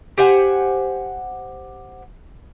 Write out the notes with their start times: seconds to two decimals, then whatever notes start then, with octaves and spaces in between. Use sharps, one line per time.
0.18 G4 C5 F#5 G#5